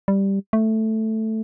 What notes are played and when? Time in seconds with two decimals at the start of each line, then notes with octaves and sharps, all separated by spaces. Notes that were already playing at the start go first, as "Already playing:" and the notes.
0.08 G3
0.53 A3